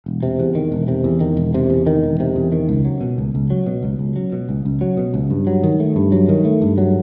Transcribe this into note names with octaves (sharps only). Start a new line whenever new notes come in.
E1
C3
E2
D#3
E1
C3
E2
D#3
E1
C3
E2
D#3
E1
C3
E2
D#3
C#2
F#3
B2
C#2
C#2
F#3
B2
C#2
C#2
F#3
B2
C#2
C#2
F#3
B2
C#2
G2
F#3
D#3
A3
G2
F#3
D#3
A3
G2
F#3